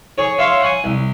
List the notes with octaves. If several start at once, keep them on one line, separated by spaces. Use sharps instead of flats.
G#4 C#5
C#5 E5 F5 C6
F#5 G#5 D#6
C2